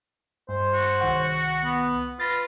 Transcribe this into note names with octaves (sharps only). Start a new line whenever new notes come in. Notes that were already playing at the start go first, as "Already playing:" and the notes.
G2 C5
F#4
C2 D#3 F#5
B3
F4 B4 A6 A#6